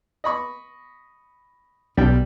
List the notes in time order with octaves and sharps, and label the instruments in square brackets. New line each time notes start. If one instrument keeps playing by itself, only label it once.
[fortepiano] D#5 B5 C#6
[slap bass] B1 [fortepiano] G3 G5